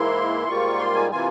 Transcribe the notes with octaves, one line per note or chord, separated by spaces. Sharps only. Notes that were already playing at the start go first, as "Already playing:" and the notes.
Already playing: G#2 E3 A#3 E4 C6
G#2 G3 A#3 F4 C#6
C6
G#5
C3 E3 A#3 F4 G#5